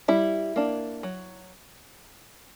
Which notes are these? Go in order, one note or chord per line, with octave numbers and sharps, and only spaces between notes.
G3 E4
A#3 D4
F#3